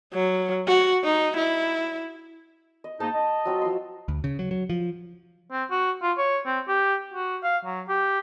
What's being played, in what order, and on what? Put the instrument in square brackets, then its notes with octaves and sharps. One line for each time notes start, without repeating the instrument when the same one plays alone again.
[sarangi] F#3
F#4
D#4
E4
[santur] D#5
[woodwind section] G#2 A#3 D#4 [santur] A5
[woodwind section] D#5
[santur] F#3 C4 F4
F3 C6
[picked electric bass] D2
C#3
F#3
F#3
F3
[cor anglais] C4
F#4
F4
C#5
C4
G4
F#4
F5
F#3
G4